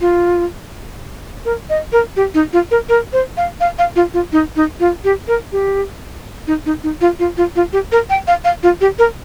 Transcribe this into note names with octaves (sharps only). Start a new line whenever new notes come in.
F4
A#4
D#5
A#4
G4
D#4
F4
A#4
A#4
C5
F5
F5
F5
F4
F4
D#4
D#4
F4
G4
A#4
G4
D#4
D#4
D#4
F4
F4
F4
F4
G4
A#4
G5
F5
F5
F4
G4
A#4